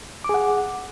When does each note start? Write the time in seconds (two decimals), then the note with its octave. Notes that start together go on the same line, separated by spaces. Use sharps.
0.24 D6
0.29 G#4
0.34 F#5